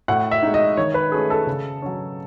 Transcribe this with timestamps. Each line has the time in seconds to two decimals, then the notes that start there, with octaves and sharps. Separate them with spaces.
0.08 A2 F#5
0.31 E5
0.42 G#3 D#4
0.54 D#5
0.77 D#3 C#5
0.94 B4
1.12 A3 C#4 G#4
1.30 A4
1.47 C#3
1.82 F#3 C#4